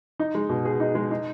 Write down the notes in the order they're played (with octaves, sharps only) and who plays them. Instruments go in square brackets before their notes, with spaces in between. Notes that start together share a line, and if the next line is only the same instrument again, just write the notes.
[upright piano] D#4
G#3
B2
G#4
D#4
G#3
D#4